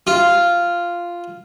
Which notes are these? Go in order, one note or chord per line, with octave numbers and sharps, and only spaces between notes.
F4